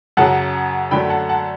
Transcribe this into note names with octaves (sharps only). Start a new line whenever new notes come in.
F#2 C#3 F#3 F#5 A5
F#2 D3 F#3 A3 G5 B5
F#5 A5
F#5 A5